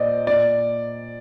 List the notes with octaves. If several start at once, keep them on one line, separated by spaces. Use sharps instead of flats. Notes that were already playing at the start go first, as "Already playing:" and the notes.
Already playing: A#2 C5 D5 D#5
A#2 D5